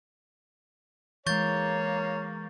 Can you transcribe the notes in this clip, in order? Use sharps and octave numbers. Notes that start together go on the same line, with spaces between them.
E3 G#3 A#3 C#5 C#6 G6 A6